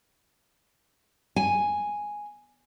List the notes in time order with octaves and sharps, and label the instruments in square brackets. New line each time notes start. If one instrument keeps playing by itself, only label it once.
[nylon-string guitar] G#5